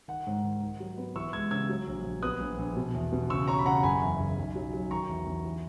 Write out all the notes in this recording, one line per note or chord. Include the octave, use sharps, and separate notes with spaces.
D#3 F#5
G#2
D#3
D#3
F#3
B3
E3 C#6 E6
G#3 E6 G#6
C#3 E6 G#6
F#3
A#1
A#1
B3 D#6 F#6
A#1
A#1
B2
E2
B2
C#3 C#6 E6
C#4 A#5 C#6
B5
C#3 F#5 A#5
F#1 G#5 B5
E2
F#1
B1
F#3
F#3
D#3 A#5 C#6
E2
E2
E3